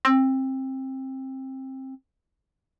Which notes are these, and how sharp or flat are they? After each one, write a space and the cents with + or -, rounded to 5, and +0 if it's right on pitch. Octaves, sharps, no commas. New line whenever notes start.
C4 +20